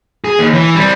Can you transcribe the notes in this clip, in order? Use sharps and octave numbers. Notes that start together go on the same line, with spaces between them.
G#4
D#2
E3
G3 C4